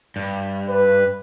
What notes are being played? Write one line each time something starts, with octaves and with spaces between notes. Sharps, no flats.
G2
B4